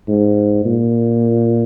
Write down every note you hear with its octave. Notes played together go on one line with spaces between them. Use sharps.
G#2
A#2